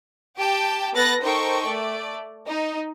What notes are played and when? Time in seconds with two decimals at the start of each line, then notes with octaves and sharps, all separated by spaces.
0.37 G4 G5 A5
0.94 B3 A4 B4 F#6 A6 A#6
1.23 D#4 A4 A#4 C5 G5 C#6
1.68 A3 D5
2.46 D#4